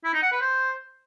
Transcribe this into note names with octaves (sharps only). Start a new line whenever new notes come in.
E4
D#4
F#5
B4
C5